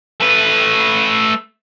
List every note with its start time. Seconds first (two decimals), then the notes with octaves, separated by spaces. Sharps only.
0.20 A3 B4